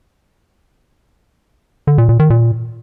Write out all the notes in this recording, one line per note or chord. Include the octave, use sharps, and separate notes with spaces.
D3
A#2
A#2
D#3
A#2